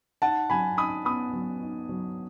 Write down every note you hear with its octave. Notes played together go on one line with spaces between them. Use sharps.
D#4 F#5 A5
F#3 G#5 B5
D#4 B5 D#6
B3 B5 D#6
F#3
D#4
F#3